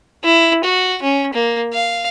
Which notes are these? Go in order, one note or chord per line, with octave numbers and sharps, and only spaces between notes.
E4
F#4
C#4
A#3
F5